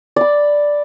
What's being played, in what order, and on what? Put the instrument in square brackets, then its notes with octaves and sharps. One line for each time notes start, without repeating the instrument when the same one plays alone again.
[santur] D5 B5